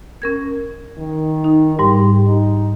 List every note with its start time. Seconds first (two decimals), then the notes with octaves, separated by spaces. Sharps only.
0.22 C#4 A#4 G#6
0.98 D#3
1.44 D#4
1.79 G#2 G3 G4
2.27 D#4